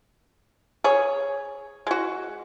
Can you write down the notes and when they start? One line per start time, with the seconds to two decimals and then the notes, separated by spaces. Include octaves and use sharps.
0.84 G#4 C#5
1.87 G#3 F#4